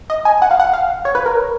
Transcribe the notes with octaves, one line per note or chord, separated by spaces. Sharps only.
D#5
G#5
F#5
F5
F#5
F5
C#5
B4
A#4